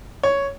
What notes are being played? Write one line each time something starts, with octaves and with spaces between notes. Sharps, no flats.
C#5